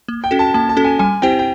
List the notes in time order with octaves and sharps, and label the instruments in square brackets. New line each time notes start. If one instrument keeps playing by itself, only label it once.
[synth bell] A#3
[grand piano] G5
[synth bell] C#4 F#4 A4
[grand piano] A5
[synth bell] A#3 [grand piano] A5
[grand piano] A5
[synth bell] C#4 F#4 A4
[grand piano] G#5
[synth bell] G3 [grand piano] G#5
[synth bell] C4 E4 G4 C5 [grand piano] G5
[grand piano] G5